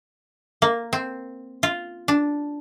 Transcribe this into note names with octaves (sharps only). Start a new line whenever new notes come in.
A#3
C4
F4
D4